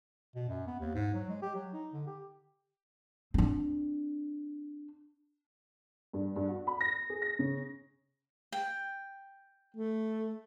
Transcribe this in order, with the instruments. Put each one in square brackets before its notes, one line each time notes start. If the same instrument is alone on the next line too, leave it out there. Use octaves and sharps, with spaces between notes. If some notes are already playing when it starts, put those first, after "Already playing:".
[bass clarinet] B2
F#2
B3
D#2
G#2
F#3
G#3
G4
F#3
D#4
D3
G4
[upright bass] C4 D4
[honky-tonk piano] G2
G2
F#4
B5
A#6
G#4
A#6
C#3
[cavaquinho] G5
[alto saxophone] A3